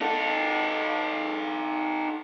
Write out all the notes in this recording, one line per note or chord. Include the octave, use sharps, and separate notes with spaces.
D#4 A4